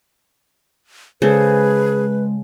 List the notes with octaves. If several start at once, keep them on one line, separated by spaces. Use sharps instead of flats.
C#3 G#3 G#4 A4 B4 C5